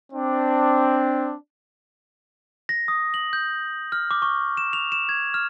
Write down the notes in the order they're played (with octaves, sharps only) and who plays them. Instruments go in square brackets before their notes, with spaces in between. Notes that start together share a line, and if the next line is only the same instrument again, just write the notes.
[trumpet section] C4 D4
[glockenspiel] A#6
D#6
F#7
G6
F6
D6
C#6
E7
F7
E7
G#6
F6